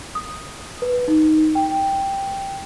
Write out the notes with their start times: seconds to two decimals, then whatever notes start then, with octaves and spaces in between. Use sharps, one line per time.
0.15 D#6
0.82 B4
1.08 D#4
1.55 G5